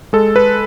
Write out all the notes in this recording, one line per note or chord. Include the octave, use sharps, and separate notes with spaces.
G#3 A4
B4